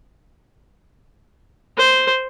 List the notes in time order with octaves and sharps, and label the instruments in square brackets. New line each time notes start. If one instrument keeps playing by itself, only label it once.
[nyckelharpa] C5